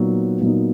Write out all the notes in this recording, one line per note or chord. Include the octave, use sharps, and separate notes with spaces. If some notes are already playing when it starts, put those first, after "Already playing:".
Already playing: A#2 F#3 B3 D#4
A#2 F#3 B3 D#4